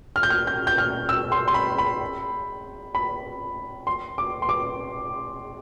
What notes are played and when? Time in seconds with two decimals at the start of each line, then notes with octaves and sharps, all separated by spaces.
0.16 F6
0.23 G6
0.30 F6
0.47 G6
0.67 G6
0.78 F6
1.09 E6
1.32 C6
1.48 C6
1.54 B5
1.78 B5
2.95 B5
3.87 C6
4.18 D6
4.42 C6
4.49 D6